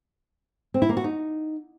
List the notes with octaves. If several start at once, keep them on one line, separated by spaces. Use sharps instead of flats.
C4
E4
A#3
F#4
D#4